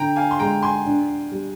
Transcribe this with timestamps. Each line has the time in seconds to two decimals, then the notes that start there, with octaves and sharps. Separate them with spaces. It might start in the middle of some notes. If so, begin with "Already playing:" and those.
Already playing: D3 G5 A#5
0.16 F5 G#5
0.31 C6
0.39 G#3 G5 A#5
0.63 G#5 C6
0.86 D4
1.32 G3